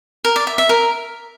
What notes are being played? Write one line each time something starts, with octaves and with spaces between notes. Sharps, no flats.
A#4
D5
E5
E5
A#4